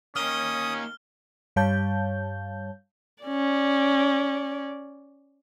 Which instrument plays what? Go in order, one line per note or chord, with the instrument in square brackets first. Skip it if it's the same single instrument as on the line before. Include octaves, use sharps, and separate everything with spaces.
[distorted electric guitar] A#3 D#4 [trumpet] C#4 [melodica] D#6 [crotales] F6 G7
[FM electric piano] G2 G3 C#5 F5 A5 G6
[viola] C#4 D5